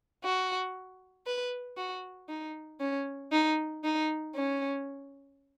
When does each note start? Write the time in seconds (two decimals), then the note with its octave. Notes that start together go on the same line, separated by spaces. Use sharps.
0.24 F#4
1.26 B4
1.77 F#4
2.28 D#4
2.80 C#4
3.32 D#4
3.84 D#4
4.35 C#4